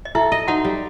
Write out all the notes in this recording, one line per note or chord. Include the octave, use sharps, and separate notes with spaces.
D#5
E4 A4 E5
D#5
D#4 F#4 F#5
G3